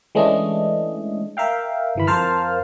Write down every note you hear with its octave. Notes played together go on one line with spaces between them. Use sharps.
E3 G#3 A3 C#4 D4 D#5
A#4 E5 F5 G5
G1 E3 B5
F2 A#4 C5 F5 A5 F6